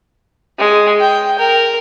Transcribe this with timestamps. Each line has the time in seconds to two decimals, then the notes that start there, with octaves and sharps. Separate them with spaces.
0.59 G#3
1.01 G5
1.39 A#4